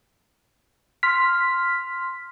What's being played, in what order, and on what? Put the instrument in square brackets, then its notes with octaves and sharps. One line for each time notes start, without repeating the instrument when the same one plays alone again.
[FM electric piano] C6 F6 B6